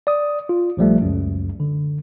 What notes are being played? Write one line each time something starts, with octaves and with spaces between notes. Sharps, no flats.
D5 D#6
F4
A#1 F3 G3 A3
C#2 F#2
D3